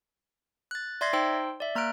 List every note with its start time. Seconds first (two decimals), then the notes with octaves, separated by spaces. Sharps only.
0.71 F#6 A6
1.01 D5 E5 C6 G#6 A#6 C7
1.13 D#4 C5 G5 C6 E6
1.60 D5 E5
1.75 A#3 A#5 F6 F#6 D7